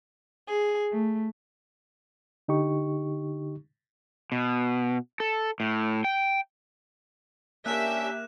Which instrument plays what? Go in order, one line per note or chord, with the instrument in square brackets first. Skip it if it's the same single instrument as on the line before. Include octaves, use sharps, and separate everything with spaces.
[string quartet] G#4
A3
[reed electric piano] D3 D#4 G4 C#6
[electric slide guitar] B2
A4
A2
G5
[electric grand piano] A#3 A#4 [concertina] C#4 D4 [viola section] G4 E5 [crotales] F#6 E7